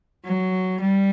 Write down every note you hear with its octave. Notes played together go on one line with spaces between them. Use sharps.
F#3
G3